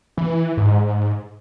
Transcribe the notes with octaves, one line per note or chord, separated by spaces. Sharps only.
E3
G#2